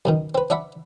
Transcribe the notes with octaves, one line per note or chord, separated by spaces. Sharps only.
F#2 B2 D#3
C4 B4
D4 D5 E5 F#5 B5